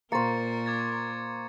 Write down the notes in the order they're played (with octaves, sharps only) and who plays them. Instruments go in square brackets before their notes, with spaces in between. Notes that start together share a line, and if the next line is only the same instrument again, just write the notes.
[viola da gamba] A#2 A#4 [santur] A#3 C5 [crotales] C#6 A6 C#7
[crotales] D6 G#6 A6